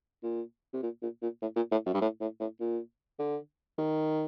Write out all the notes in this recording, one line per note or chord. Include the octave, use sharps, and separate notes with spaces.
A#2
C3
A#2
A#2
A#2
A2
A#2
A2
F#2
G2
A2
A2
A2
A#2
D3
D#3